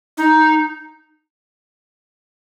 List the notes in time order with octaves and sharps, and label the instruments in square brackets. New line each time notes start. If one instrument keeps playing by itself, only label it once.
[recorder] D#4